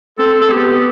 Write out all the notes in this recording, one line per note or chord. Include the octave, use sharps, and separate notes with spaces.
C4 A4
A4
B3 G4